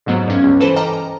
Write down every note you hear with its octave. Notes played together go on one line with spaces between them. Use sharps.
F2 G#2 F#3 B3
G2 C#4
C#2
E3 A4 B4 C5 A5 E7
D#5 G5 A5 A#5 D6 F6
A#5